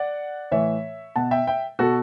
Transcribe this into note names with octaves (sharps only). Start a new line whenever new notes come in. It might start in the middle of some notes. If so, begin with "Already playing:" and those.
Already playing: D5 F#5
A2 E3 C#5 E5
B2 F#5 A5
E5 G5
E5 G5
B2 F#4 A4